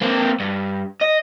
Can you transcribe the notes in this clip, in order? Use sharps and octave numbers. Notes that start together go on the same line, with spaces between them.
A#3 C4
G2
D#5